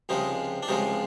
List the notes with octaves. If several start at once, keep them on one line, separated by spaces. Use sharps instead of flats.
C#2 C3 F3 G#3 D#4
D4
C#2 C3 F3 G#3 D#4